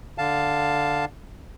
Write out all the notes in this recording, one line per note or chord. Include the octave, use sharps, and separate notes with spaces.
D3 F5 A5